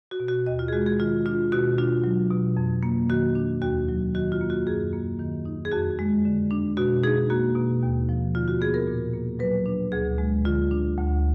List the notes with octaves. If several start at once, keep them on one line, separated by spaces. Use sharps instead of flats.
F#4
B2
F#4
D#2 D#5
F4
G#4
G#3 F#4
G#4
D#3 F4
D4 F4
B2 F#4
D4 F4
F#3
B2
F2
A#3
D#3 F#4
D4
D#2 F#4
F#3
D#3 F#4
F4
A#3
F#4
F#2 G#4
A#3
D#3
D#4
G#4
F2 F#4
G#3
D3
D4
B2 F#4
D#4 G#4
A#3 F#4
B2
D#2
F3
D3 F4
F#4
B3 G#4
A#4
A#2
A#3
F#3 B4
D4
D2 G#4
G#3
D3 F4
D4
D2